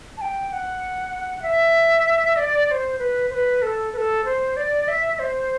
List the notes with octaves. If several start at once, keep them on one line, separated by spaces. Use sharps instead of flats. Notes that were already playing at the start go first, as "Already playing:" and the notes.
A5
G5
G5
F#5
E5
D5
D5
C5
B4
C5
B4
A4
B4
A4
C5
D5
E5
C5